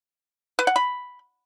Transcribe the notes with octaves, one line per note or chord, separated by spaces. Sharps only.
B4
F#5
B5